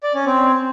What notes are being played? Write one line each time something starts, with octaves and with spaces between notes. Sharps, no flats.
D5
C#4
C4